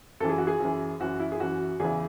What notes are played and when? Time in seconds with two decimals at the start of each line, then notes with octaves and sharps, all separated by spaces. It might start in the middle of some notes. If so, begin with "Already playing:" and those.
0.20 F#2 A4
0.25 E3 G#4
0.38 F#4
0.47 G#4
0.60 F#2 E3
1.00 F#2 E3 F#4
1.20 E4
1.32 G#4
1.40 F#2 E3 F#4
1.80 E2 C#3 E3 G#4